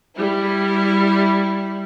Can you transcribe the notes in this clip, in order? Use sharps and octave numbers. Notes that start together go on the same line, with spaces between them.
G3 E4